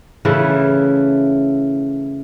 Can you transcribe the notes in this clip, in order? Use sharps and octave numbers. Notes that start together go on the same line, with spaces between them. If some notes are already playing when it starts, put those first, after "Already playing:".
C#3 E3 A3 E4